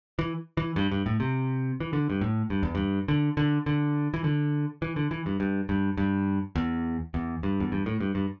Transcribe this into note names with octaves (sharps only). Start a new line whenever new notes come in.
E3
E3
G2
G2
A2
C3
E3
D3
G2
A2
G2
E2
G2
D3
D3
D3
E3
D3
E3
D3
E3
G2
G2
G2
G2
E2
E2
G2
E2
G2
A2
G2
G2